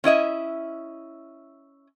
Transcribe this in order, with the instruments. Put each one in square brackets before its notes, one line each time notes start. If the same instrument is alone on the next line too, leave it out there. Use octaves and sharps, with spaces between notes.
[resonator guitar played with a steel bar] C#4 E4 D#5 E5